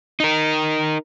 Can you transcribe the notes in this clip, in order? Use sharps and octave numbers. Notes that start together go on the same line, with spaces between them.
D#4 A#4